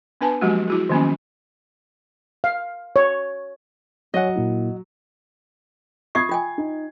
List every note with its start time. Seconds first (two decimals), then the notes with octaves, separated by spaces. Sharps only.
0.21 B3 D4 B4 G#5 A5
0.41 F3 F#3 G#3 A#3 F#4 G4
0.68 E4 F#4 G#4
0.89 D#3 F3 F#3 A#3 B3 C#4
2.44 F5
2.96 C#5
4.14 F#3 F#4 C#5 D#5 F#5 G#5
4.36 A#2 A#3 E4
6.15 F4 E5 C#6 D#6 G#6 C7
6.29 F4 G5 G#5
6.58 D#4